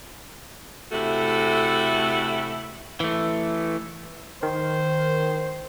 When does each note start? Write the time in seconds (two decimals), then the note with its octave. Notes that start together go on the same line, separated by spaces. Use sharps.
0.92 C3 A3 E4 F#4 A4
3.00 E3 A3
4.43 D#3 C5